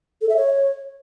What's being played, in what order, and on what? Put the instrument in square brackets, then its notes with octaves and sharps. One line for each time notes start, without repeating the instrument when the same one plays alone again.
[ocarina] A4
E5
C#5